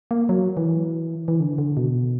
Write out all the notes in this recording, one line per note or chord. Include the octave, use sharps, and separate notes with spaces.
A#3
F#3
E3
E3
D3
D3
B2